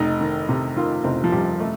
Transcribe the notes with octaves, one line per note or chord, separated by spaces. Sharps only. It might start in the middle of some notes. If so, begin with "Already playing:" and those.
Already playing: F1 D#4
D#3
C3
D#3 F4
F1 C4
F3
C3 G3
A3